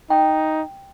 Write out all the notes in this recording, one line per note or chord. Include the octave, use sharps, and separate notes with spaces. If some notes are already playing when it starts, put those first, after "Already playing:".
D#4 G5